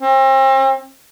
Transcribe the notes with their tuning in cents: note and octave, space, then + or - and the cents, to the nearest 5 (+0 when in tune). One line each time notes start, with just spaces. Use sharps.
C4 +40